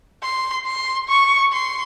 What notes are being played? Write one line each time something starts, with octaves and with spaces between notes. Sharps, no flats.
C6
C6
C#6
C6